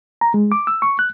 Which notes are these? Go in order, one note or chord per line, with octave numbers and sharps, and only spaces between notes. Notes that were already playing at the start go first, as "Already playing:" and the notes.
A#5
G#3
D6
E6
C#6
F#6